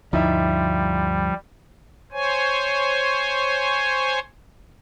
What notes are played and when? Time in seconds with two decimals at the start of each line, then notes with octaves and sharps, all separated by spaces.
0.13 D2 G2 F3 G3 D#4 E4 E5
2.12 C5 C#5 G#5